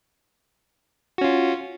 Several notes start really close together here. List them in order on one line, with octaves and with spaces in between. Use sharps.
F#4 C#4 F4